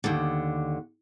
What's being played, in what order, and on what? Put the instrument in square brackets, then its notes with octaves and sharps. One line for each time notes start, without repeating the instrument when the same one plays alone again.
[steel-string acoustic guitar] D#2 D3